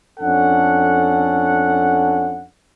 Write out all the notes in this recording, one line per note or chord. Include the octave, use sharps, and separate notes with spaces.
F2 C#4 D4 A4 F#5